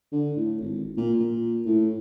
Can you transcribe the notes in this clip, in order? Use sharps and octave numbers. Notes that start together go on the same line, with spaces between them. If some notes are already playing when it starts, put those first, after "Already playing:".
D3
A2
G#1
A#2
A#2
A2